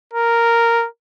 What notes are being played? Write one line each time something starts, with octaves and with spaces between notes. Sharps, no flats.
A#4